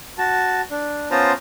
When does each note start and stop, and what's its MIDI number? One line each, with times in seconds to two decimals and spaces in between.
0.18 0.61 66
0.18 0.61 81
0.70 1.09 62
1.11 1.32 59
1.11 1.32 61
1.11 1.32 65
1.11 1.32 72
1.11 1.32 81
1.11 1.32 82